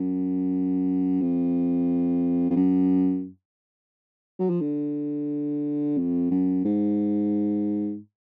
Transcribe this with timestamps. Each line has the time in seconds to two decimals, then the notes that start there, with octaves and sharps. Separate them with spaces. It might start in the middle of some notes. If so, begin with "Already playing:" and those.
Already playing: F#2
1.21 F2
2.50 F2
2.56 F#2
4.40 F#3
4.50 F3
4.61 D3
5.98 F2
6.31 F#2
6.65 G#2